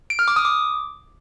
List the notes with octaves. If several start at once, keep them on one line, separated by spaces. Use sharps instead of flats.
D7
F6
D6
D#6
D6